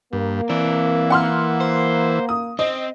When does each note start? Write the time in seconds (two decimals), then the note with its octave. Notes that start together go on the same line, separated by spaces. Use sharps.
0.13 G2 A#3
0.50 E3 C4 D5
1.10 F#5 C6 F6
1.60 C5
2.29 D#6
2.59 C4 D#5